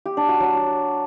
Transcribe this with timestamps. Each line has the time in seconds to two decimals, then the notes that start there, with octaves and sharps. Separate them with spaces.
0.06 G4
0.17 D4
0.29 F#4
0.40 F#3